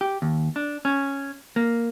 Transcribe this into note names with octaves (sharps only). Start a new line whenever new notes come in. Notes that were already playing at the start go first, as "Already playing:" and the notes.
G4
D#2
D4
C#4
A#3